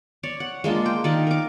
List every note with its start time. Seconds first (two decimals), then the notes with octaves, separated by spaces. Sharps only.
0.23 C#5 D5
0.40 F#5
0.64 G#3 A#3 D4 F4
0.86 G5
1.04 D#3 A#4 D5 D#5
1.27 A#4 D6